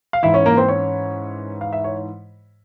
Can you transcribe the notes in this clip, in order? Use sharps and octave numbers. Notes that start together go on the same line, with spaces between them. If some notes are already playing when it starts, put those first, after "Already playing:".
F5
G#2 E3 E4 E5
C#4 C#5
A#3 A#4
C4 C5
C#4 C#5
F5
E5
C#5